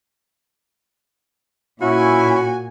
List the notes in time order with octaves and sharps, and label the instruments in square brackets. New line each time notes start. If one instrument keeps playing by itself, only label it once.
[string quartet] A#2 G#5 [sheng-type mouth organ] C#4 [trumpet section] E4 [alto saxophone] F#4